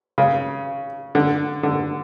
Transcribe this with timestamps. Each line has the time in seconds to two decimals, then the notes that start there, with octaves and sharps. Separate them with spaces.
0.18 C#3
1.15 D3
1.63 D3